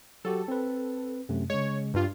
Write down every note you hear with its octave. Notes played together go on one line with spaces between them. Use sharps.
F#3 F#4 G4 A4
C4 B4
F#2 C3 A3
C#3 G#3 C#5
G2 F4